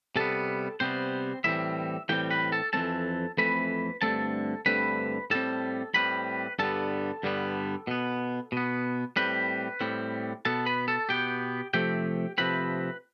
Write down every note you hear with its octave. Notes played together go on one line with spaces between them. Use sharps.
C3 G3 B3 A4 A5
C3 G3 B3 C4 C5
A2 E3 G3 C4 E4 E5
A2 E3 G3 C4 G4 G5
B4 B5
A4 A5
F2 E3 A3 C4 A4 A5
F2 E3 A3 C4 B4 B5
G2 D3 A3 C4 A4 A5
G2 D3 A3 C4 B4 B5
A2 G3 C4 A4 A5
A2 G3 C4 B4 B5
G2 D3 G3 B3 A4 A5
G2 D3 G3 B3
B2 B3
B2 B3
A2 G3 C4 B4 B5
A2 G3 C4
B2 B3 A4 A5
B4 B5
A4 A5
B2 B3 G4 G5
C3 F3 A3 C4 G4 G5
C3 F3 A3 C4 B4 B5